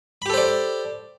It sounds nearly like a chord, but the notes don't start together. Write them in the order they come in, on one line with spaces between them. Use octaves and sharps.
B5 G4 A4 C5 D5